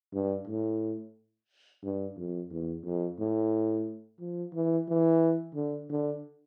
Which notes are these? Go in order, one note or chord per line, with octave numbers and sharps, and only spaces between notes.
G2
A2
G2
F2
E2
F2
A2
F3
E3
E3
D3
D3